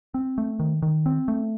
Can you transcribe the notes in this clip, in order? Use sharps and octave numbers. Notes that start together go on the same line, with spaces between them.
C4
A3
D#3
D#3
C4
A3